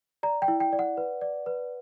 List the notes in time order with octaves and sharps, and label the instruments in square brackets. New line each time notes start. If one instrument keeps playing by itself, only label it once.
[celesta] D5 A#5
G5
E4
G5
D5
F#5
B4
D5
B4